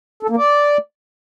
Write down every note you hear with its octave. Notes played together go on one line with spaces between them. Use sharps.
A4
A#3
D5